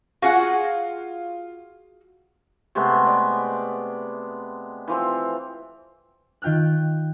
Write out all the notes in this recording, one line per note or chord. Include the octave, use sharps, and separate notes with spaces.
F4 F#4 G#4 F#5
C3 G#3 A3 B3
D5
E3 F3 C4
D#3 F4 G5 F6 F#6